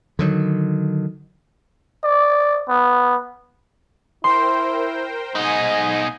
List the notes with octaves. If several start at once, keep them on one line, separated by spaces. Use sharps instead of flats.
D3 D#3 F#3
D5
B3
E4 A#4 C5 G5 C6
G#2 B2 D#4 D#5 G#5